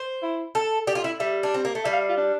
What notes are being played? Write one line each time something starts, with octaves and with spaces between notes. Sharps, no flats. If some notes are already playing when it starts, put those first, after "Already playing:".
Already playing: C5
E4
A4
G4 D5
F4
E4 E5
G3 E5
D4
C4
A#3
A3
G3 E5
F5
E5
F4
D4